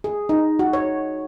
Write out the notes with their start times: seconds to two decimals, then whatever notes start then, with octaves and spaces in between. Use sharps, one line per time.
0.04 G#4
0.29 D#4
0.59 F#4
0.73 C#5